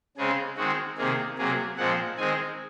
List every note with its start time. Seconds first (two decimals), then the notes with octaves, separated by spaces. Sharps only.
0.17 C#3 G#3 C4 G#4
0.57 D#3 G#3 C4 F#4
0.97 C3 D#3 A#3 G#4
1.38 C3 F#3 A#3 G#4
1.77 A#2 F3 G#3 C4 F#5
2.18 D#3 G#3 C4 G#5